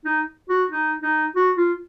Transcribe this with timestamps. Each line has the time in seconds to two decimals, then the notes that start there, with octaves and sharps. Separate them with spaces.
0.05 D#4
0.49 F#4
0.70 D#4
1.02 D#4
1.36 F#4
1.57 F4